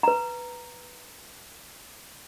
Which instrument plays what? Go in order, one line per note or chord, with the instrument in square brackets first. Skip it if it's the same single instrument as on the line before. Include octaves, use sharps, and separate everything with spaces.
[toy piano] B4 A#5